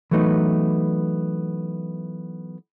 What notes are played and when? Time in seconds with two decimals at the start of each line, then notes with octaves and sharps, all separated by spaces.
0.11 E3 F#3 A3 B3 D#4